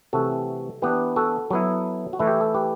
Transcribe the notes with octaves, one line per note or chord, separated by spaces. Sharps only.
C3 E3 A3 F#4 A4
E3 B3 D4 G4 B4
F#4 A4
F#3 B3 E4
F#4
E3 A3 E4
G4
A4
G4 B4